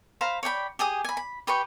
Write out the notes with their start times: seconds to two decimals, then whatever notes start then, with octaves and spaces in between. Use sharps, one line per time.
0.21 C5 F5 A#5 B5
0.43 C#5 D5 G5 B5
0.79 G4 G#4 G#5 D#6
1.04 G#5 B5
1.17 B5
1.47 G4 B4 G5 C#6